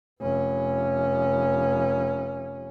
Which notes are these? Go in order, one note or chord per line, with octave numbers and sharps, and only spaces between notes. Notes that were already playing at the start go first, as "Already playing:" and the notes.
F1 C#4